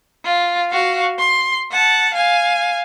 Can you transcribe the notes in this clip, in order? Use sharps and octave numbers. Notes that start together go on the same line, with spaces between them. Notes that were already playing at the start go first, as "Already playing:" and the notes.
F4
F#4 F5
C6
F#5 A5
F5 G#5